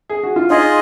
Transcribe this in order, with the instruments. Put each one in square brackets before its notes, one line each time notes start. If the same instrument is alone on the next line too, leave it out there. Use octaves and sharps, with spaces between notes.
[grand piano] G#4
F#4
F4
[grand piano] D#4 [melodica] F4 G#4 D#5